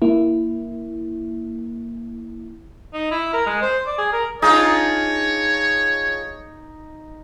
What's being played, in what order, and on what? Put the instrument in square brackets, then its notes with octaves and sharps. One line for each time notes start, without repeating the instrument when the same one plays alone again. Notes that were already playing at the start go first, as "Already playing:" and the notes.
[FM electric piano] A#3 E4
[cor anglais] D#4
E4
A#4
G#3
C5
D5
G#4
A#4
[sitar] D4 F4 G#4 [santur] D#4 [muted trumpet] C#5